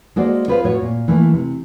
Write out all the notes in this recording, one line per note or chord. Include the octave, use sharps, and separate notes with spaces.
G#3 A#3 F#4 A4 C5 D5
F4 G#4 B4 C5 D#5 F5
A2 F#4 C#5
A#2
E3 A3 A#3 E4
C3